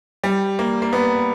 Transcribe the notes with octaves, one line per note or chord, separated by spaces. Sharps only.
G3
A#3
A#3
B3